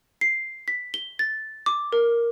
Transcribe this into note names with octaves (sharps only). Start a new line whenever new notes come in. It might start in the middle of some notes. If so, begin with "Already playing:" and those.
C7
B6
G7
A6
D6
A#4